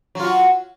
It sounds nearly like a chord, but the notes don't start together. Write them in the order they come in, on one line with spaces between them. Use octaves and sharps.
F#3 F4 F#4